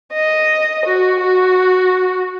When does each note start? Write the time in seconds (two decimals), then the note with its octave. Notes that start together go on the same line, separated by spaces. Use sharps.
0.13 D#5
0.85 F#4
1.21 F#4